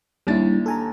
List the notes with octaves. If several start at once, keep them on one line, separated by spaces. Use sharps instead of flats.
D#2 G3 D4 E4 A6
A4 G#5 A#5